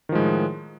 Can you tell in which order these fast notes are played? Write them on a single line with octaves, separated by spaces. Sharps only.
D#3 F3 G#3 A2